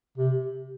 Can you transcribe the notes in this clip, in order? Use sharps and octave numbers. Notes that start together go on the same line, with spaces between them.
C3